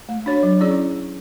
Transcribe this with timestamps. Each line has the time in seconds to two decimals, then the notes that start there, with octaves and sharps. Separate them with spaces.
0.09 A3
0.26 D4 F#4 C#5
0.43 F#3
0.60 C#4 E4 G#4 D5